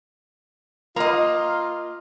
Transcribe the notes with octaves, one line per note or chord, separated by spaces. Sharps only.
A#3 F4 D#5